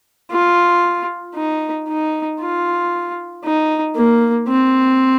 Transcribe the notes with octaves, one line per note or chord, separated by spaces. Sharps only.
F4
D#4
D#4
F4
D#4
A#3
C4